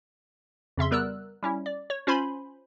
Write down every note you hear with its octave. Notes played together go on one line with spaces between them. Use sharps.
F2 C#3 E5 C6
G3 B3 A#4 D5 E6 F#6
G3 C#4 E4
D5
C#5
C#4 F4 C5 G#5 B5 C6